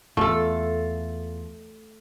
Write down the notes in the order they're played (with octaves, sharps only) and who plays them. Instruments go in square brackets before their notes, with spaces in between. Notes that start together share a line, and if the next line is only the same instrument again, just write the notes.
[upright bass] E2 [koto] A3 [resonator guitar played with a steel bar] F4 A4